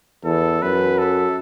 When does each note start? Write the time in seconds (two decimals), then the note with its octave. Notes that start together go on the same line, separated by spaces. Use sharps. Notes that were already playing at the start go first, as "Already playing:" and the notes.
0.24 E2 A4
0.61 F#2 B4
0.98 A4